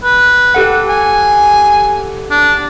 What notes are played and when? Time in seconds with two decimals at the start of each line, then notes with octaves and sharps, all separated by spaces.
0.04 B4
0.55 G4 A4 F#5
0.89 G#5
2.31 D4